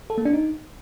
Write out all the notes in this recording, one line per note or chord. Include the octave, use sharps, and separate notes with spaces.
A4
A#3
D4
D#4